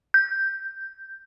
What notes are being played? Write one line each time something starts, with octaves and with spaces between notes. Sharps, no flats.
G6